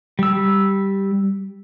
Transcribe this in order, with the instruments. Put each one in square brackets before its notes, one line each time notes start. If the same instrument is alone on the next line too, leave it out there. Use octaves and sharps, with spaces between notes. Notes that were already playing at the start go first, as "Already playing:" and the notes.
[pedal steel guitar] G3 E6